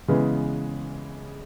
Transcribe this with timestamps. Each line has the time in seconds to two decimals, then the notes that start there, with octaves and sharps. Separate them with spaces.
0.08 C#3 E3 G#3 B3